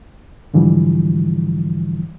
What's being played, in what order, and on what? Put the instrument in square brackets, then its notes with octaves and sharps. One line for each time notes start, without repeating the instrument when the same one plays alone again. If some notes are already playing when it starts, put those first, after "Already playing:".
[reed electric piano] G#2 D3 E3 F3 G3